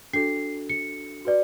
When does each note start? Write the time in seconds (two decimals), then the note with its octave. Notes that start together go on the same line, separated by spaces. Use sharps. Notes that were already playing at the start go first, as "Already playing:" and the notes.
0.13 D4 F#4 A4 C7
0.69 C#7
1.25 F#4 B4 D5